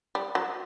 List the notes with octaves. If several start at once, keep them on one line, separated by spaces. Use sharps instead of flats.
G3
F#3